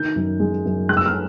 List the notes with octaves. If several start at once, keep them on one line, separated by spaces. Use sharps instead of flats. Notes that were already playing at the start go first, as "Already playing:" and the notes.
Already playing: D#3 G6
F#2
G#3
F#2
G#3 F#6
E6
F6